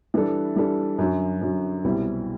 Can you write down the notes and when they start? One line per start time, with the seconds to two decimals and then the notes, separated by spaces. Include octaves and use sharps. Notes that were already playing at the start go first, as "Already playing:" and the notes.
0.14 E3 G3 D4 A4
0.56 E3 G3 D4 A4
0.98 F#2 D3 F#3
1.41 F#2 D3 F#3
1.84 C2 B2 G3 C4 E4